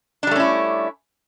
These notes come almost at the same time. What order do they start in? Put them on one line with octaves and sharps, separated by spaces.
D4 G3 A3 C#4 E4